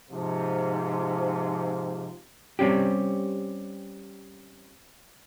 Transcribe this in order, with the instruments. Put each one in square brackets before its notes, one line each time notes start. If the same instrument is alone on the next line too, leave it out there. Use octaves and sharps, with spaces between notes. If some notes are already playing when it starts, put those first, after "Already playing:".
[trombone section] G#2 C3 F3
[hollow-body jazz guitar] G3 C4 C#4 G4